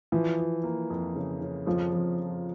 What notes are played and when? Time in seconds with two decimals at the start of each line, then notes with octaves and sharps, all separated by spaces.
0.12 E3 F3
0.38 F3
0.64 A#3
0.90 F2
1.15 C#3
1.41 C#3
1.66 F2 F3
1.92 F2
2.18 F3